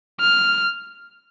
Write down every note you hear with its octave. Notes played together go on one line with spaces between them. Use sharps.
F6